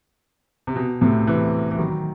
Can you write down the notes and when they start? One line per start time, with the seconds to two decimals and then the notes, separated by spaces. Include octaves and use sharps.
0.67 C3
0.76 B2
1.01 A2 C3
1.27 C3 E3
1.71 E3
1.79 D#3 F#3